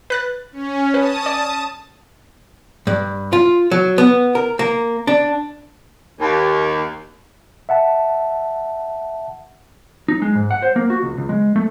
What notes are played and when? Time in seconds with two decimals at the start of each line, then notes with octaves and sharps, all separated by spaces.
0.10 B4 F#6 A6
0.52 C#4
0.94 B4 A5 D#6
1.26 D5
2.87 G2
3.33 F4
3.71 F#3
3.98 B3
4.35 A#4
4.59 A#3
5.07 D4
6.20 D#2
7.69 E5 F#5 A5
10.08 D#4
10.22 G#3
10.35 G#2
10.51 F#5
10.62 C5
10.76 A#3
10.90 F#4
11.03 C#2
11.17 C#2
11.29 G#3
11.56 A3